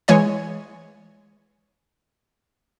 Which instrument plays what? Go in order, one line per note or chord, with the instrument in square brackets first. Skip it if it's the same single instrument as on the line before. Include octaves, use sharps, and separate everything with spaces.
[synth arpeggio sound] E3 G#3 C#5 G#5